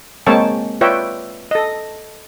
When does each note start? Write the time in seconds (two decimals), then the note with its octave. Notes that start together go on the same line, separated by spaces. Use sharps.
0.27 G#3 A#3 C4 C#5 G5 A5
0.81 F4 B4 C#5 D5 E5 G5
1.51 A4 D#5